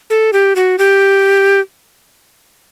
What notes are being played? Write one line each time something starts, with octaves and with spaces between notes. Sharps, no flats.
A4
G4
F#4
G4